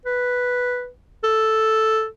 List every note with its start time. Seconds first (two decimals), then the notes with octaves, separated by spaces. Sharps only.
0.05 B4
1.24 A4